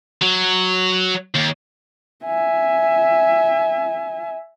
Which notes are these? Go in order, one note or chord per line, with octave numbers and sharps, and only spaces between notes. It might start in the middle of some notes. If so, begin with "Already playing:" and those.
F#3
D#2
E5 G#5